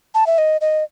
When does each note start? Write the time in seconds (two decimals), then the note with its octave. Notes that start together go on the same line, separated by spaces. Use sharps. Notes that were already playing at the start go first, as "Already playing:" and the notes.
0.14 A5
0.27 E5
0.38 D#5
0.61 D#5